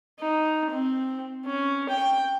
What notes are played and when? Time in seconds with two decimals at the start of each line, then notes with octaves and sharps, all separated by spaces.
0.19 D#4
0.71 C4
1.46 C#4
1.89 G5